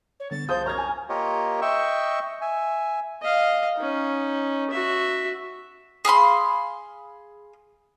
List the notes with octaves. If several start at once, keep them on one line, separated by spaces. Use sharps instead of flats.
C#5
D3 G3 B3 A6
C2 F3 C5 D#6 G6
F#2 A#5 C#6 F6 G#6
G#5
A#3 F4 G4 A#4 C#5 D#5
D#5 E5 G5 C#6 E6
E5 G#5
D#5 F5
C#4 D#4
F#4 E5
G#4 F5 B5 C6